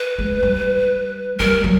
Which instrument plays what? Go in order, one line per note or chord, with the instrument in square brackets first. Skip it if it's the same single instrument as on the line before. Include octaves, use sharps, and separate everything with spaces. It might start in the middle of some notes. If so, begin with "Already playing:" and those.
Already playing: [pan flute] B4
[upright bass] G#3
G3
[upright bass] G3 [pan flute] A#4
[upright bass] F#3